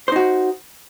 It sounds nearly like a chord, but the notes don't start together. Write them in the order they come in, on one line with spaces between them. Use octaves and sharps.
C5 D#4 F#4